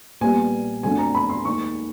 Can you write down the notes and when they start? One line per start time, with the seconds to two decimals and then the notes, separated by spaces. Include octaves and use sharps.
0.21 A#1 A#2 G3 B3 G#5
0.83 F2 D3 F#3 A3 D4 G#5
0.98 A#5
1.15 B5
1.29 C6
1.45 D#2 D#3 G#3 C#6